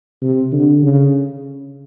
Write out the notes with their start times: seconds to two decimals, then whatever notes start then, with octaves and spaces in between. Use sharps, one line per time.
0.22 C3
0.52 D3
0.82 C#3